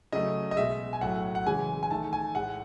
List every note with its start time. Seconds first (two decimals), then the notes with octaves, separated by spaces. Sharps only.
0.12 C#3 F#3 A3 D#5
0.51 D#5
0.57 B2 G#3 E5
0.93 G#5
1.01 A2 F#3 A3 F#5
1.35 F#5
1.47 C#3 E3 G#3 G#5
1.83 G#5
1.91 D#3 A3 A5
2.13 G#5
2.35 A2 G#3 F#5